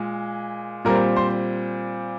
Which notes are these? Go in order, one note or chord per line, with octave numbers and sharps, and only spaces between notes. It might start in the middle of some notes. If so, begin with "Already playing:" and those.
Already playing: A#2 G#3
A#2 G3 C4 A#4
C5